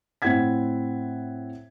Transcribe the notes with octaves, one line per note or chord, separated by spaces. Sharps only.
A2 C4 E4 F#5 G#6 B6